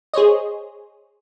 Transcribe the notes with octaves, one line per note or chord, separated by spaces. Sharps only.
G#4 C5 C#5 D#5